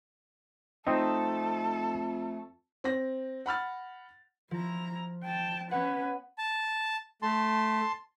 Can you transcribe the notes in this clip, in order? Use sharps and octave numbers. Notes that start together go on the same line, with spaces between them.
F2 A3 C4 D#4 A4 D#5
C4 A#6
F#5 B5 F6 A6
F3 E4 A#5
G5 A5
B3 C#4 B4 C#5 F#5
A5
A3 A5 C6